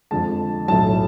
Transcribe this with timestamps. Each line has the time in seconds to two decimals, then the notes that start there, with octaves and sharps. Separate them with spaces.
0.11 F2 D3 F3 G#3 A5
0.68 B1 A2 F#3 A5